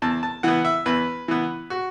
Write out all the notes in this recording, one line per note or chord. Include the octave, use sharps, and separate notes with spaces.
E2 A5
A5
E3 B3 F#5
E5
E2 B4
E3 B3
F#4